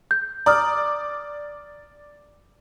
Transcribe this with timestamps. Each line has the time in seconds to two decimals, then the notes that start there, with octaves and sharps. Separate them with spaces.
0.11 G6
0.46 D5 A#5 D6 D#6 F6